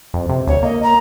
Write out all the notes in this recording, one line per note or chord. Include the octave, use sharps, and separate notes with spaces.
F2
C3
D2 C#5
A#3 D#5
A#5